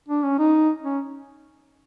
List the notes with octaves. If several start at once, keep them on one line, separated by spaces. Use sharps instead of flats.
D4
C#4
D#4
C#4